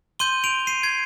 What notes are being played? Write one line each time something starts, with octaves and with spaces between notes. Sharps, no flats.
C6 G6 D#7 G7
D7 F7
C7 D#7
G#6 C7